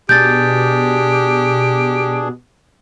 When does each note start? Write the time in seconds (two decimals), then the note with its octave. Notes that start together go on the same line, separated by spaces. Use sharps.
0.09 B2 D4 G4 G#4 G6 A6